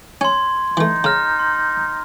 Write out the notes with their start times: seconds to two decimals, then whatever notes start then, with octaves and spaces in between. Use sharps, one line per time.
0.21 C#4 C6 G#6
0.77 E3 A3 D#4
1.04 C#3 A#5 F6 A#6
1.39 C6